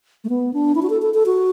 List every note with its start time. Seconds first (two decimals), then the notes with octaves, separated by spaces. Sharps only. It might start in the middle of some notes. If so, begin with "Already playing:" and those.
0.24 A3
0.29 B3
0.53 D4
0.75 E4
0.82 F#4
0.90 A4
1.02 A4
1.14 A4
1.26 F#4